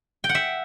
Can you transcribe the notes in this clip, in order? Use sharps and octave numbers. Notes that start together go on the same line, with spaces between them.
G5
F#5
E5